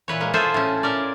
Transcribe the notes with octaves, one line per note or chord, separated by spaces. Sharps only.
A#2 E3 B4 C#5
G#3 A#3
F4 G#4 A4 C5 E5
A2 C#4
C#4 A#4 D5